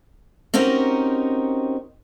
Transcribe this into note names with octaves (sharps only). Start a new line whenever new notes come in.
C4 C#4 D#4 F#4 G4 A#4